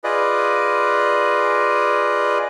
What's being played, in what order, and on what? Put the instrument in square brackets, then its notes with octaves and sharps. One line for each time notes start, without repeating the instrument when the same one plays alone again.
[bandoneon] F4 G#4 B4 D5 D#5